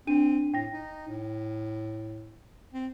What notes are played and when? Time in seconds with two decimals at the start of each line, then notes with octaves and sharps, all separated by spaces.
0.07 C4 D4 D#7
0.54 A2 G5 A#6
0.72 D#4
1.09 A2
2.74 C4